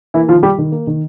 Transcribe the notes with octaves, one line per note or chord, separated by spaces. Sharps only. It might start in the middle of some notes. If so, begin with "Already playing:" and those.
E3 A#3 E4
D#3 F3 F4
G3 G4
D#3
A#3
D#3